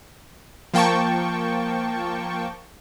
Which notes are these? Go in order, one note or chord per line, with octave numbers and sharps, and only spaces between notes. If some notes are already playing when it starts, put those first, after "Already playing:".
F3 A#3 G5 A5 C#6